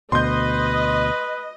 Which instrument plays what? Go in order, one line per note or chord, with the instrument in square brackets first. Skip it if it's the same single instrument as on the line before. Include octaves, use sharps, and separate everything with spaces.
[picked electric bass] D2 B2 [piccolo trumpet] B4 [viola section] D#5 [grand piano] C6 G6